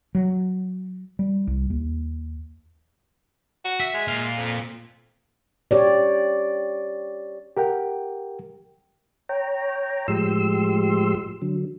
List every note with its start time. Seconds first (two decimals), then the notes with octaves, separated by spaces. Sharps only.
0.15 F#3
1.19 G3
1.47 C2
1.70 D#2
3.65 F#4
3.80 E5
3.94 G#3
4.08 A#2 F5
4.37 F2
5.71 G4 C#5 D5
7.57 G4 A#4 F#5 G5
9.29 C#5 G5 A#5
10.08 A2 F3 G#3 G4 C6 E6
11.42 D3 F#3